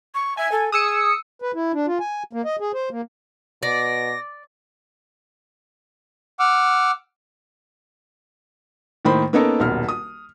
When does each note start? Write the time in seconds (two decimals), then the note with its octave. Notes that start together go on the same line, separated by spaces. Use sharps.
0.14 C#6
0.37 E5 G#5
0.51 A4
0.72 G#4 D#6 E6 C#7
1.42 B4
1.55 E4
1.73 D4
1.87 F4
2.00 G#5
2.33 A#3
2.45 D#5
2.60 G#4
2.74 C5
2.91 A#3
3.63 B2 D5 A#6
6.39 F#5 D6 E6 F6
9.05 A2 D#3 A#3 C5 B5
9.33 A#3 B3 C#4 D#4 A4 A#4
9.60 D#1 B1 F6
9.88 D#6